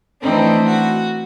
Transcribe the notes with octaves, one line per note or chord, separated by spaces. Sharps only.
E3 A3 C4 D4 D#4
F#4